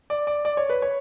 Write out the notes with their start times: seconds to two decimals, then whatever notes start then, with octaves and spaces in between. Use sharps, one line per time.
0.10 D5
0.27 D5
0.45 D5
0.57 C#5
0.70 B4
0.82 C#5